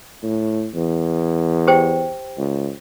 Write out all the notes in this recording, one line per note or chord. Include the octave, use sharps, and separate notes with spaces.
A2
E2
G4 C5 G5
C#2